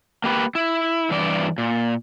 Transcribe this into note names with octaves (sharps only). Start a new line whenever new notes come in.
A#3 G4 B4
E4
G2 E3 D5
A#2